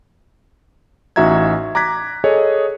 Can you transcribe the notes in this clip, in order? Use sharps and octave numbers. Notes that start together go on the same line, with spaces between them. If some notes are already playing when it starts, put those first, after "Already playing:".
A1 D#4 F#4 E5 A#5 G#6
A#5 D6 F#6 G#6 B6
G#4 A4 C#5 D#5